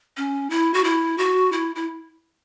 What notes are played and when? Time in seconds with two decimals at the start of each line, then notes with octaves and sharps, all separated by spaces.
0.17 C#4
0.50 E4
0.74 F#4
0.84 E4
1.18 F#4
1.52 E4
1.75 E4